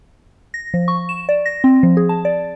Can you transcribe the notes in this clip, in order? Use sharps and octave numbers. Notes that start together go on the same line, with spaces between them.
A#6
F3
C#6
E7
D5
A#6
C4
F3
G#4
A5
D5